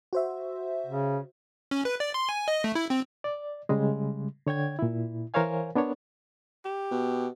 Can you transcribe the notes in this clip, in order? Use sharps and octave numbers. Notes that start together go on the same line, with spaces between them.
F#4 C5 E5
C#3
C#4
B4
D5
C6
G#5
D#5
A3
E4
C4
D5
C#3 G3 G#3
D3 C#5 G5 G#6
A#2 E4
E3 A#4 C5 C#5 F5 G#5
B3 D4 A#4 C#5
G4
B2